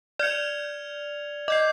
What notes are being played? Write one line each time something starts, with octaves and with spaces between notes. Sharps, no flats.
D5 F6 G#6 C#7 F7
D#5 D6 G6 C7